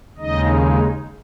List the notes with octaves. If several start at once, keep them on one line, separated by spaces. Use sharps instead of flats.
D#2 C#3 G#3 D#4 D#5